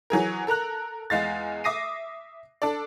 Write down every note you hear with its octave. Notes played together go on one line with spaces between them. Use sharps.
E3 F#3 G#4 A#4
A4 A#4 A#5 F#6
E2 G#3 F5 A6
E5 D6 D#6 A#6 C7 D#7
D4 A4 D5